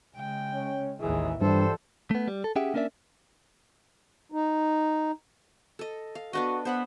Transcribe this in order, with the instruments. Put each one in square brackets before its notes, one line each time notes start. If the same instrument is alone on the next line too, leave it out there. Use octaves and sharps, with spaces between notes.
[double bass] C#3 G#3 [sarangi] G5
[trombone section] C#4
[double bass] A1 D#2 [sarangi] E3 [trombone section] G#3 G#4
[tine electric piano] G2 [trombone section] D3 G3 C5 [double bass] E3 F3 [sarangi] A4
[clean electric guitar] A3 B3
G3
A4
C#4 G4 G#4 E5 F#5 G5
A#3 C#4 D4 A#4 D5 E5
[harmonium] D#4
[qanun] A4 D#5
F5
[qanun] B3 D4 D#5 [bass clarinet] F#4
[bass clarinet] B3 [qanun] C5 F#5 B5